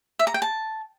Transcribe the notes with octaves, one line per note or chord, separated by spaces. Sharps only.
E5
A#5
G5
A5